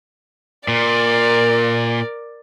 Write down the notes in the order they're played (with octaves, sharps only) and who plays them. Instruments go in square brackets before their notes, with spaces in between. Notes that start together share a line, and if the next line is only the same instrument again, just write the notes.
[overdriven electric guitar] A#2 [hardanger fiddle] A#4 D5